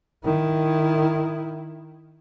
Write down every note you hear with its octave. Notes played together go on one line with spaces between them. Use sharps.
D#3 E4